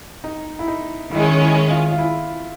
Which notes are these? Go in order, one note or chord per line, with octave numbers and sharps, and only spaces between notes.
D#4
E4
D#4
D#3 G#3 C#4 E4
E4
F4
F4
E4